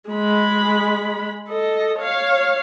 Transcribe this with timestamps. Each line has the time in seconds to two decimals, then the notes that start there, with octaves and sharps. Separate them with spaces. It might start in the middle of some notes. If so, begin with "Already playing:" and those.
0.10 G#3 B5
1.49 A4 D#5
1.99 C#5 F5